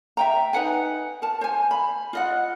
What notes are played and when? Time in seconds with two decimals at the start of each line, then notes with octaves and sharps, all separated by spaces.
0.17 E5 G5 A#5
0.53 D#4 B4 F#5 G#5
1.22 A#4 A5
1.41 C5 G#5
1.71 B5
2.13 F4 D#5 F#5